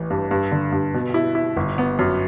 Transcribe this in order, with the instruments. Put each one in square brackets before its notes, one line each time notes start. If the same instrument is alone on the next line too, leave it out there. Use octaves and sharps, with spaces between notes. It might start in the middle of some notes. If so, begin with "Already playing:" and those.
Already playing: [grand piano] A1 E3
G2
G2
D3
G2
B2
E4
E4
G1
B3
F#2